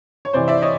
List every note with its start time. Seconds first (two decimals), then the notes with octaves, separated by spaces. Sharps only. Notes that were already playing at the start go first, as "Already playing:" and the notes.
0.25 C#5
0.33 C3 E3 C5 D5
0.48 D5 E5
0.62 C#5 D#5